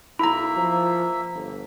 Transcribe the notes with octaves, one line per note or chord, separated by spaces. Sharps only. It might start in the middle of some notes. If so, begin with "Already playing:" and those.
B1 A#3 E4 E5 A#5
F3
G1